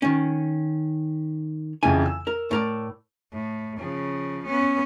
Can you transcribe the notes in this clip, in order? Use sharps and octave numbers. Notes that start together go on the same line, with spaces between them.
D#3 C#4
F2 C#3 E3 G#5
E6
A#4
A2 A#4 D5
A2
C#3 F3
B3 C#4